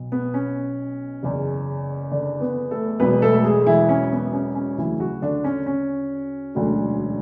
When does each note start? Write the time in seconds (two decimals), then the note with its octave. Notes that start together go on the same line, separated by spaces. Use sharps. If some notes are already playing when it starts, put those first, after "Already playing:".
Already playing: B1 B2
0.12 B3
0.34 C#4
1.23 F#1 E2 C#3
2.11 D3 D4
2.40 B3 B4
2.71 A3 A4
3.00 E1 E2 B2 F#3 B3 B4
3.22 A3 A4
3.44 G#3 G#4
3.66 E3 E4
3.89 C#4
4.12 B3
4.33 C#4
4.55 C#4
4.77 D2 C#3 E3 F#3 E4
5.00 F#3 F#4
5.22 D3 D4
5.44 C#4
5.66 C#4
6.55 E1 D2 D3 F#3